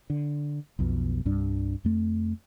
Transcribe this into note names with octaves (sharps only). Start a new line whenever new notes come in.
D3
B1 F2 B2
C2 G2 G3 D4
F2 A3